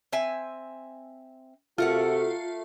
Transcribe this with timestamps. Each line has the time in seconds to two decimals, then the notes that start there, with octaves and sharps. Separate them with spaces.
0.12 C4 E5 G#5
1.78 C3 A3 F4 F#4 A4 A#4 F#5